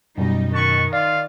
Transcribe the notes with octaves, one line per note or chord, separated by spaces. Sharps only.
F#2 B2 G3 D#4
D#3 B4 A5 C#6
F4 D5 F5